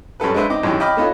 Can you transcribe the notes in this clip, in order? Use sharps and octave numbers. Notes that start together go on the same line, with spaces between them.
F#2 G3 A4 B4
G#3 D4 B4 C5 E5
C4 D#4 D6
G#1 F#2 D#3 E3 G4
D#5 G5 B5 D6 F6
A3 B3 D#4 F4 C#5